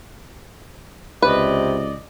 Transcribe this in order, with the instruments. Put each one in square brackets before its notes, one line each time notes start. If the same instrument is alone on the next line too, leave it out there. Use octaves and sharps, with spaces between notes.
[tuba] C#2 [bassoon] C3 [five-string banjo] B4 [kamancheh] D5 D#5